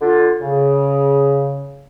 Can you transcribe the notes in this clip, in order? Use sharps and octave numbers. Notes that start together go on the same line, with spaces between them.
D3 F4
C#3